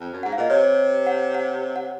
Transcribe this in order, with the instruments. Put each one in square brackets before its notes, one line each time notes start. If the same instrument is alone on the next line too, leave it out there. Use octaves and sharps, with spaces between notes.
[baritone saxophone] F2
F#2
[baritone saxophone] G#2 [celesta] F#5
[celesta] F5
[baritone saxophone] A#2 [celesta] D#5
[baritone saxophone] C3 [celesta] C#5
[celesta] F#5
F#5
F#5